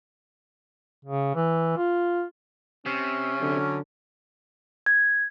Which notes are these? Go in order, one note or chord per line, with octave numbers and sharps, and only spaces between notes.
C#3
E3
F4
C3 C#4
D3 F#3
G#6